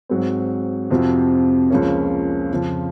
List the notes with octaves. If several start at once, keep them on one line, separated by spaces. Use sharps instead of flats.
G#2 F#3 C4
F2 C3 F3 C4 F#4
C#2 C#3 F3 A#3 C#4
F2 C#3 F3